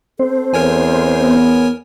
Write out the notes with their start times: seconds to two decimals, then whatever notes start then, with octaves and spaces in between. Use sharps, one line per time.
0.19 C4 A4 C5
0.54 E2 A#4 C#5 G#5
1.22 B3